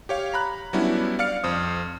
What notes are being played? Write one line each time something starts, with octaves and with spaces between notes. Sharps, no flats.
G4 C#5 F5
A#5 B5 F#6
F#3 G3 B3 C#4 D4 E4
D5 F5 F6 C#7
F2 C5 D#6